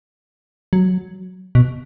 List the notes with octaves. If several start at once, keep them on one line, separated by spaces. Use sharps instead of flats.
F#3
B2